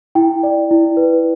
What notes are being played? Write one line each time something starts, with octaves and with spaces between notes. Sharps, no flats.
E4 G5
D5
E4
B4